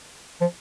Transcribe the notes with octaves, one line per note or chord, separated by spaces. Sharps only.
F3